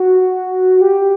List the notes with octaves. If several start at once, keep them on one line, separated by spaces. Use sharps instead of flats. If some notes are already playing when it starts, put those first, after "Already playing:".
Already playing: F#4
G4